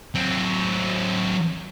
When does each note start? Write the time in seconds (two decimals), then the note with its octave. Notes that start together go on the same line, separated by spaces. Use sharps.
0.15 F#3 C4